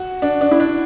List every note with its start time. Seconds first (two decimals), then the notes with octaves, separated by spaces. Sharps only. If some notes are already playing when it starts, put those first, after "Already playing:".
Already playing: F#4
0.22 D4
0.41 D4
0.51 E4
0.60 D4